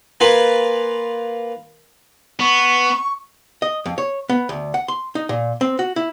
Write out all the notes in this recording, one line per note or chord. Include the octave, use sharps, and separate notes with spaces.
A#3 F4 B4 G#5
B3 C#6
D#5
F2
C#5
B3
D2
F#5
C6
D#4
A#2
C4
F#4
E4